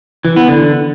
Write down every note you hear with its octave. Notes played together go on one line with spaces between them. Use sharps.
E3
B3
D3